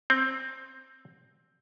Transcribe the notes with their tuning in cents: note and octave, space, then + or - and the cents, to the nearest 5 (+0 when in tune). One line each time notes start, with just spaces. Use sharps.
C4 +10